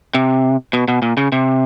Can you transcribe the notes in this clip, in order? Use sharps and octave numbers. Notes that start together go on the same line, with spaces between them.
C3
B2
B2
A#2
C#3
C3